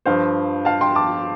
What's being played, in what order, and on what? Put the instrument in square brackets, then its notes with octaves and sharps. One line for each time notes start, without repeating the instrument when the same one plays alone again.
[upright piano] G2 F3 C5 F5
F5 A5
G5 C6
A5 D6